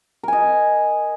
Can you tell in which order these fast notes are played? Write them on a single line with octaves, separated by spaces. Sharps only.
A#4 G#5 D#5